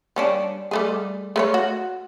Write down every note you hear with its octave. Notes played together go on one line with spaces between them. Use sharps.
G3 C#4 D4
G3 A3 G#4
A3 B4 C#5
F#4